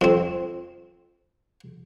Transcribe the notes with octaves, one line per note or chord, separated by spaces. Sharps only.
F2 C4